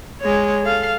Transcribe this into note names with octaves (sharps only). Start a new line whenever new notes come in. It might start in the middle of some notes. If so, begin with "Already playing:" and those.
G#3 C#5
A4 F5